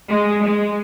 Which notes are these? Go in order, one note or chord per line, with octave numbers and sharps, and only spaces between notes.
G#3
G#3